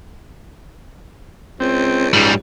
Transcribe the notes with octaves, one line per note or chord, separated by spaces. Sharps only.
C#2 C4
G#2 G3